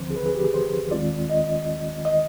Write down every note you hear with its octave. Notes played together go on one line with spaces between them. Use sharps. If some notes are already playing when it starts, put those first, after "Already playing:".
Already playing: D2 D3 F3 C4 C5
G#4
B4
G#4
G4
G#4
C5
D#2 D#3 G#3 C4 F4 D5
D#5
D#5